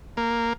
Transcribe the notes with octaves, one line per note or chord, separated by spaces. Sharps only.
A#3